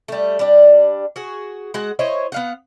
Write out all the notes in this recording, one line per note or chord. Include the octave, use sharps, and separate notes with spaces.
G3 A3
G3 D4
F#4 G#4
G#3 F#4 F#5
E4 C5 C#5 D#5
B3 F5 F#5